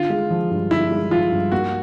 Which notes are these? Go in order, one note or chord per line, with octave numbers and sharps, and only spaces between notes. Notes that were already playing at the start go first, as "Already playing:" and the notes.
Already playing: D3 F4
G#3
F3
G2
D3 E4
G#3
F3 F4
G2
A#3 F#4